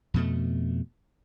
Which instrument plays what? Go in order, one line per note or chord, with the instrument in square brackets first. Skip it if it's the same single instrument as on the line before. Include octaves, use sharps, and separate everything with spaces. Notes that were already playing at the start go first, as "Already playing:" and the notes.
[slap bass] F2 B2 A3